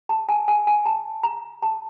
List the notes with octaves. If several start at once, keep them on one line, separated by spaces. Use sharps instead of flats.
A5
G#5
G#5
G#5
A5
A#5
A5